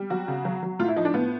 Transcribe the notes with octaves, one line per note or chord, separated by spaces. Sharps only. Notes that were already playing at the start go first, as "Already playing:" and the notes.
Already playing: G3
F#3 F#4
C#3
F#3
F#3
A2 F4
E4
F3 D#4
D4
A2 B3